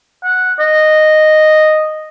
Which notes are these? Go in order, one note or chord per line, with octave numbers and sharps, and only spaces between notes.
F#5
D#5